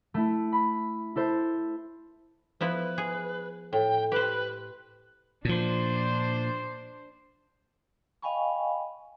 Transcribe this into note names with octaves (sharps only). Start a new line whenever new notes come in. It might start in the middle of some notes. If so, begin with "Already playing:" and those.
A3 E4
B5
E4 A4 C5
F3 B3 E4 B4
G#4
A2 G5
G4 B4 C5
A#2 F3 D4 C5
D#5 F5 G5 G#5 B5 C#6